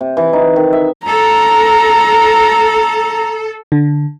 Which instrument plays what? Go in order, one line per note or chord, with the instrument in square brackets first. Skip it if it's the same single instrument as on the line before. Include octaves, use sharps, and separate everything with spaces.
[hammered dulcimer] C3
E3
D#4
D#3
E5
[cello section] A4 [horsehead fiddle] A#5
[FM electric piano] D3